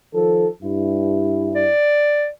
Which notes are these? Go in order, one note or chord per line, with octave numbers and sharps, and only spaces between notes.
D#3 F3 A4
G2 E4
D5